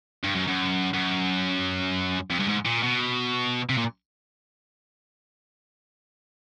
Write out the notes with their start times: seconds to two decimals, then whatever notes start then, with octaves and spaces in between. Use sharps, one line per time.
0.24 G2
0.36 F#2
0.48 F#2
0.94 F#2
2.31 F2
2.40 G2
2.48 G#2
2.66 A#2
2.83 B2
3.69 C3
3.77 A#2